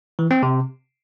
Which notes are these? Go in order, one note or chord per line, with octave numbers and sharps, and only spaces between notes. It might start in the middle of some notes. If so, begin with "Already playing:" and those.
E3
C4
C3